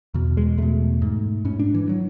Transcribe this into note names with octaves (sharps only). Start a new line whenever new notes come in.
E2 B2
G#3
E2 B2 A3
G#2
G#2 C#4
D4
E3
F#3